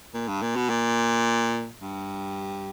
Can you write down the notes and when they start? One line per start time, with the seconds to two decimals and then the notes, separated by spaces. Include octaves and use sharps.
0.14 A#2
0.28 G2
0.42 A#2
0.56 B2
0.70 A#2
1.82 G2